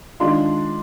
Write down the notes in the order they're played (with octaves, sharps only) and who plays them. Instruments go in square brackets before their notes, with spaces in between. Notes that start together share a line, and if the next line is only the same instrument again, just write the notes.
[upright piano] D#3 G#3 D4 F4 C6